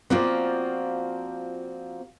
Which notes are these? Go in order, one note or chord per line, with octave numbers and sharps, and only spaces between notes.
F3 A#3 C4 F4 F#4 D5